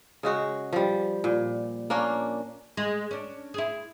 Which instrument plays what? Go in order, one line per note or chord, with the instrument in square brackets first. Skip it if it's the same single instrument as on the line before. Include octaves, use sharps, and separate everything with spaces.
[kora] C#3 G#3 F#4
F3 G3
A#2
A#3 C#4 D4
[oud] G#3
C#4 D4
E4 G#4